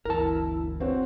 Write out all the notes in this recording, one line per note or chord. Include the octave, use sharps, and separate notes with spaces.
G1 D2 E3 E4 A#4 A5
C4 F#4 C#5